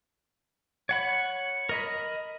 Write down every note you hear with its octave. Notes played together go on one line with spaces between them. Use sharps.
C#5 F#5 B5
A#4 D#5 B5